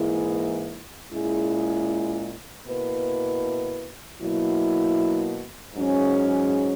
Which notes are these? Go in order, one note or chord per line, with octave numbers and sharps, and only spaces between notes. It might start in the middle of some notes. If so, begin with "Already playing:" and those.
Already playing: G#2 E3 A#3 E4 G#4
A#2 G#3 C#4 E4 G#4
B2 A#3 E4 B4
B2 F#3 A#3 E4
G#2 F#3 C#4 G#4